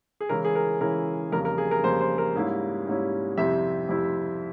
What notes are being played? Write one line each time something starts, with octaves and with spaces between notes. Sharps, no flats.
G#4
C#3 E3 G#3 C#4 E4 A#4
G#4
A#4
C#3 E3 G#3 C#4 E4 A#4
F2 C#3 G3 A#3 A#4
A#4
G#4
A#4
F2 C#3 G3 A#3 C5
C5
A#4
G#2 G3 A#3 C#4 E4
G#2 G3 A#3 C#4 E4
F2 C3 G3 C4 E4 E5
F2 C3 G3 C4 E4